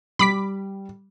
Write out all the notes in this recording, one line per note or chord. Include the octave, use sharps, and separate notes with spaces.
G3 B5 D6 B6